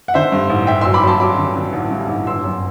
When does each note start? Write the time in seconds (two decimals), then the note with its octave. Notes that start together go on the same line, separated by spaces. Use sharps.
0.08 F#5
0.14 D3 C5 E5
0.32 G2
0.50 A1
0.67 A1 E5 G5
0.81 F#3 C6 E6
0.94 B5 D6
1.03 F#3 A5 C6
1.20 F#3 B5 D6
1.38 D3
1.56 D3
1.73 A1
1.91 G2
2.09 A1
2.27 G1 C6 E6
2.44 F#2